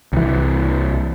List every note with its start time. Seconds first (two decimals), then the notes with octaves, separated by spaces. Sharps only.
0.13 C2 E3